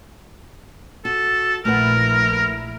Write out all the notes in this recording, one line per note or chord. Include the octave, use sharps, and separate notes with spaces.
F#4 A4
A#1 A3 E4 A#4 B4 F#5